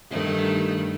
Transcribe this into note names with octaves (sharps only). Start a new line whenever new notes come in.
G2 D#3 A3